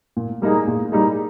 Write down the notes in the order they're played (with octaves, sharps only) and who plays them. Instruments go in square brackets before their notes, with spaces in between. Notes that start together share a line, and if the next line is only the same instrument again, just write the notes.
[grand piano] A#2
G3 A#3 D#4 G#4
A#2
G3 A#3 D#4 G#4